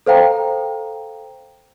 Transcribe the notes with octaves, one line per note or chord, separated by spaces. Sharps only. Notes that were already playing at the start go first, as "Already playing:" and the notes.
A4 C5 F5 G5 A#5